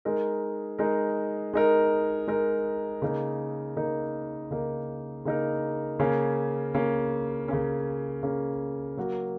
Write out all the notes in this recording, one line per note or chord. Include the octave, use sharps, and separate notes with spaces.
G#3 D#4 A#4
G#3 D#4 A#4
G#3 D#4 A#4
G#3 D#4 A#4
C#3 A#3 D#4 A#4
C#3 A#3 D#4 A#4
C#3 A#3 D#4 A#4
C#3 A#3 D#4 A#4
C#3 A#3 C#4
C#3 A#3 C#4
C#3 A#3 C#4
C#3 A#3 C#4
F#3 A#3 F#4 A#4